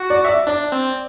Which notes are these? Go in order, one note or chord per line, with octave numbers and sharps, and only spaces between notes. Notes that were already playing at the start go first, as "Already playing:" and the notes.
Already playing: F#4
D5
E5
D5
D4 D5
C4